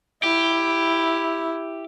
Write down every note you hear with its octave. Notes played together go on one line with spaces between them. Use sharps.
E4 G4